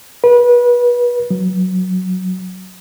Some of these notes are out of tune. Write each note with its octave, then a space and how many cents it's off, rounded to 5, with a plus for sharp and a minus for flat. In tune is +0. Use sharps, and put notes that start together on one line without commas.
B4 -30
F#3 +0